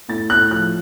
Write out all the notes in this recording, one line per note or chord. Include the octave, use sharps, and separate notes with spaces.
A2 A6
A2 F#6
F3 F#6